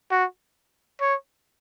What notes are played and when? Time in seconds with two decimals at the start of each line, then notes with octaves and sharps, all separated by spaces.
0.11 F#4
1.01 C#5